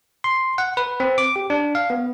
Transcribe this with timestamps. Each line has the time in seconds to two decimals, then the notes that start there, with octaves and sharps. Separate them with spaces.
0.24 C6
0.58 F#5
0.77 B4
1.00 C4
1.18 D6
1.36 G4
1.50 D4
1.75 F5
1.90 B3